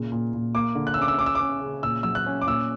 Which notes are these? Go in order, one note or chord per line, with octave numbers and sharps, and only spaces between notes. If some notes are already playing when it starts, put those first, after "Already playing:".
Already playing: A#2 C#3
A#2
A#2
A#3 D6
D3
F#6
E6
C#4 D6
E6
C#4 D6
E6
D6
C#4
C#3
A#2 E6
F#3 E6
F#6
C#4
D6
A#2 E6